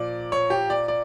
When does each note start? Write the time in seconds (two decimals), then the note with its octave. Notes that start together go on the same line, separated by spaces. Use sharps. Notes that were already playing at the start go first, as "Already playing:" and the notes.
Already playing: A#2 F3 D5
0.32 C#5
0.50 G4
0.70 D5
0.88 D5